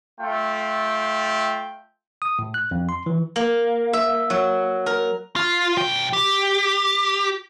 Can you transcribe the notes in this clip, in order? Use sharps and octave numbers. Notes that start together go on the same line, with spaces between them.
A3 F4 G5
D#6
A2
F#6
F2
C6
E3
A#3
E5
F#3
A#4
F4
B1 G5
G4